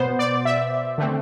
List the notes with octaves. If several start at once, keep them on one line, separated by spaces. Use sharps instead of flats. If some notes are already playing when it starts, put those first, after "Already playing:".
Already playing: B2 B3 C5
D5
E5
D3 A3 C4